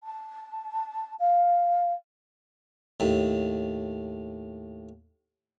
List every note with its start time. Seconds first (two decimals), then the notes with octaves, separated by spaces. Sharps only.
0.03 A5
1.19 F5
3.00 D#2 A2